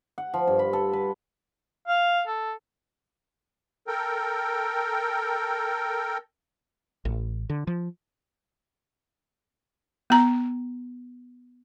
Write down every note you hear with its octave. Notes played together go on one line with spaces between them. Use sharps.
F#5
F3
G2
B5
A4
B4
F5
A4
A4 A#4 G5
A1
D3
F3
B3 A#5